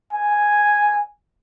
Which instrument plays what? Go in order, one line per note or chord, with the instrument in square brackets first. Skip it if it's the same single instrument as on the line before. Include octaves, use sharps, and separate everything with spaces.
[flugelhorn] G#5